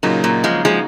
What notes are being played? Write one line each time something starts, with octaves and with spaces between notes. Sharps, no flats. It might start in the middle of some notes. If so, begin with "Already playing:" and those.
A#2 C#3 F#3 A#3 D#4
A#2
F3 G#3
F3 G#3